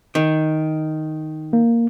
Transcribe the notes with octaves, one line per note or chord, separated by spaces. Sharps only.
D#3
A#3